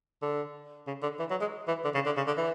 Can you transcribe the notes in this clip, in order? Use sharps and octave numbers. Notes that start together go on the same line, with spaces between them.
D3
C#3
D3
E3
F#3
G#3
E3
D3
C#3
D3
C#3
D3
E3